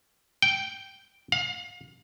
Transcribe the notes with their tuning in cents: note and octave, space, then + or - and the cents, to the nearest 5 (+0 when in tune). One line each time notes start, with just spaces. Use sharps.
G5 -5
F5 +35